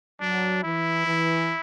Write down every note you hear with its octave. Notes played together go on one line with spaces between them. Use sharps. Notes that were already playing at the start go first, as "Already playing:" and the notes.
F#3 D4
E3 E4
E3